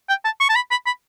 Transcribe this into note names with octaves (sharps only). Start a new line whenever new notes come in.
G5
A5
C#6
A5
B5
B5
B5